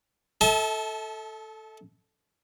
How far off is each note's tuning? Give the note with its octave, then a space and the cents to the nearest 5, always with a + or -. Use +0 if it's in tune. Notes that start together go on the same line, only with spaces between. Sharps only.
A4 +0 E5 -40 A5 -25